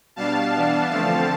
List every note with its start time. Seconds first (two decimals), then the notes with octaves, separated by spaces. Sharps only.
0.16 B2 G3 D4 F5 A5
0.53 E3 B3 D4
0.90 D3 F3 A3 C4 F5 A5